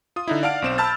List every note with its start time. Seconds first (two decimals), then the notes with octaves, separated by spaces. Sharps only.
0.16 F4 D#6
0.28 D3 D#4 E4
0.43 D5 F5 F#5 A5 F6 D7
0.62 B1 C4 E7
0.78 A5 B5 E6 F6 G6 A6